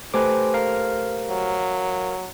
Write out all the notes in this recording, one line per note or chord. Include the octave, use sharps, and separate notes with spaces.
A3 G4 B4 C5 G#5 D6
A#4 F5
F#3